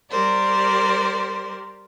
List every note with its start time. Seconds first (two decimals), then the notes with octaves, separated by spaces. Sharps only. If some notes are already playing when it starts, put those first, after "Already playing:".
0.11 G3 G4 A#4 C5 D5